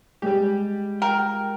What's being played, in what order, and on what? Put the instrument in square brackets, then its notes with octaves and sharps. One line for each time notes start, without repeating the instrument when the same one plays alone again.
[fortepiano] G3 G4 [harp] G#3
[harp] F4 [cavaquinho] A#4 [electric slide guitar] G5